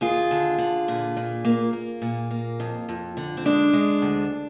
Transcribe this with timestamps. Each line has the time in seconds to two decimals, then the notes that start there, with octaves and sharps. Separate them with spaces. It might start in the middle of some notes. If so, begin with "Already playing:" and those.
0.01 D#2 F4 G#4
0.31 D3
0.58 D3
0.88 A#2
1.16 A#2
1.45 A#3
1.73 A#3
2.02 A#2
2.31 A#3
2.60 F2
2.89 F2
3.17 D3
3.37 C4
3.45 G#3 D4
3.73 G#3
4.02 D2